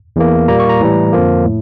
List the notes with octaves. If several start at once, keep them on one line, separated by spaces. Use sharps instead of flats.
E2 E3 A#3
A#2 G3 A#3 A#5
C#6
A#5
A2 E3 G3
F2 D3 F3 A#3
A2